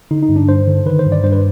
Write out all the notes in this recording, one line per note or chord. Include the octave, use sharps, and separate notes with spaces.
D3 D#4
D#4
G2
D4
G2 C5
D3
D#3 B4
C5
G2
D5
G2 C5
B4